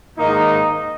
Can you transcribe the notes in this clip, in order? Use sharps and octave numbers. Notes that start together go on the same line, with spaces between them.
G#2 D#3 A#3 D#4